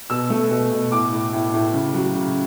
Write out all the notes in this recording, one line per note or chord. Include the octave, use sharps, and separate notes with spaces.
B2 E6
A3
B2
B2
A2 D6
A2
A2
A2
C#3
F#3
C#3